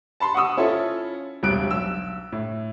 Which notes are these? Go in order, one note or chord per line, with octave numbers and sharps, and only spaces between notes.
A5 B5 C6
F#5 C#6 D#6 E6
C#4 E4 F4 A4
E1 C2 G2 G4 F#6 D7
B1 E6
A2